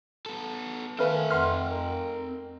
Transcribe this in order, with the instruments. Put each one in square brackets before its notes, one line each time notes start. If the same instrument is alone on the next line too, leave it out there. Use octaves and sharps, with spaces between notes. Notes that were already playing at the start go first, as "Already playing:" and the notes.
[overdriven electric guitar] B3 A4
[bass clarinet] D#3 [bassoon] A3 [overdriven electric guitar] C4 G#5 [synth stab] B4 F5
[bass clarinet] F2 [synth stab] F#5 C6 F6
[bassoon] A#4